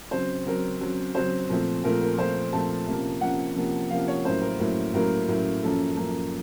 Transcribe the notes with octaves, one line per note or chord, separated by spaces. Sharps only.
C#3 F#3 C4 C5
C#3 F#3 C4 A#4
C#3 F#3 C4
C#3 F#3 C4 C5
A#2 F3 A3 C4
A#2 F3 A3 C4 A#4
A#4
A#2 F3 A3 C4 C5
A#2 F3 A3 C4 A5
C3 F3 A#3 C#4
C3 F3 A#3 C#4 F#5
C3 F3 A#3 C#4
C3 F3 A#3 C#4 F5
C#5
A2 F#3 A#3 C#4 C5
A#4
A2 F#3 A#3 C#4
A2 F#3 A#3 C#4 A#4
A2 F#3 A#3 C#4
F#2 F3 A#3 C#4 A4
F#2 F3 A#3 C#4